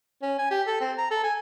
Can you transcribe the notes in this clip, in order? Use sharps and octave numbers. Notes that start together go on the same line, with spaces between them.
C#4
G#5
G4
A4
C4
A#5
A4
G#5